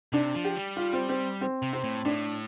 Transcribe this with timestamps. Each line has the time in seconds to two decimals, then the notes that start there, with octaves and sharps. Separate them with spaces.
0.13 C3 D4
0.35 F3
0.45 G4
0.56 G3
0.76 F4
0.93 C4
1.09 C4
1.41 C4
1.62 C3
1.73 C4
1.84 A2
2.05 A2 D4